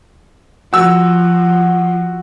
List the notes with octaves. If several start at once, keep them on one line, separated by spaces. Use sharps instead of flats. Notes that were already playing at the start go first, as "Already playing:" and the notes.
F3 F#4 E6